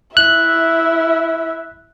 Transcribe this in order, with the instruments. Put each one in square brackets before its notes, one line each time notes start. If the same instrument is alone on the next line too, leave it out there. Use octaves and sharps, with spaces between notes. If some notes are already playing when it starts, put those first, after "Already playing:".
[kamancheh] E4 E5 [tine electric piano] F#6